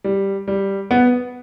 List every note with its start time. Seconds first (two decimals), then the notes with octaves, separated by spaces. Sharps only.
0.04 G3
0.48 G3
0.91 B3